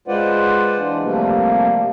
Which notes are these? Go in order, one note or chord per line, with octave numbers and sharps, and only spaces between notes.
G#3 F4 B4 C5 D5 F#5
E3 D4
C3 F3 G3 A3 A#3